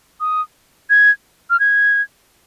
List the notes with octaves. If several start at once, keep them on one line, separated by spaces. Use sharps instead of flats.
D#6
G#6
F6
G#6